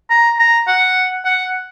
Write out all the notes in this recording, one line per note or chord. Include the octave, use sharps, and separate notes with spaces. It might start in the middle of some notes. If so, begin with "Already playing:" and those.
A#5
A#5
F#5
F#5